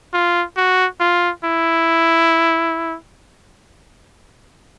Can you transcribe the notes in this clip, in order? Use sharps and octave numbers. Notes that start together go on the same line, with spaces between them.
F4
F#4
F4
E4